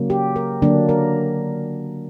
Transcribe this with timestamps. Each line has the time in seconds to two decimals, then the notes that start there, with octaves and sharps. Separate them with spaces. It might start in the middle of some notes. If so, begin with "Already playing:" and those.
Already playing: C#3 F#3 A#3
0.10 G4
0.36 A#4
0.62 D3 F#3 A#3 D4
0.89 A#4